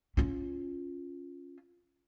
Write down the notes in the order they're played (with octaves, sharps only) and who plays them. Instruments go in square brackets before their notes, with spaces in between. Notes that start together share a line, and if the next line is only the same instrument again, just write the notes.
[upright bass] C#4 F4